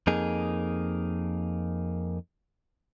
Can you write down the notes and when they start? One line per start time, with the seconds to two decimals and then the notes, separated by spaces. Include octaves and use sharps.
0.07 F2 A#3 D#4 G#4